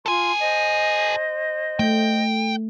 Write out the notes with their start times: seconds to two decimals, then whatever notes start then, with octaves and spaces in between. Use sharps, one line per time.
0.06 F4 A4 G#5 C6
0.39 C5 D#5
1.79 A3 G5